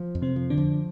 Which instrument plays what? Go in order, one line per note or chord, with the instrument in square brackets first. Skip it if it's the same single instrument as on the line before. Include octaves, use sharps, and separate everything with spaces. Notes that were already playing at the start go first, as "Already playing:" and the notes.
Already playing: [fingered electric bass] F3
F2
[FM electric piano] C3 C4
[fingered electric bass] F3
[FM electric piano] D3 D4
[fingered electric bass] F3